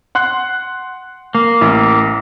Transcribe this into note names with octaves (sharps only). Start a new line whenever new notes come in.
F#5 C6 F#6
A#3
A1 E4